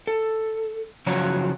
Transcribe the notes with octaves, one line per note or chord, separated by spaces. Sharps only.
A4
C#3 F3 F#3 F#4 C#5 A#5